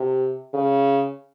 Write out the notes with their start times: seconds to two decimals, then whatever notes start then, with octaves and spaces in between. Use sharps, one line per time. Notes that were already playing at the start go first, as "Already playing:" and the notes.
Already playing: C3
0.54 C#3